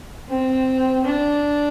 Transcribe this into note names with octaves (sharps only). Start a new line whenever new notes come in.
C4
D4